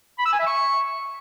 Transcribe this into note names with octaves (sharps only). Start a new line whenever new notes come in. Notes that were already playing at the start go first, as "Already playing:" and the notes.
B5
E6
G#5
E5
C#6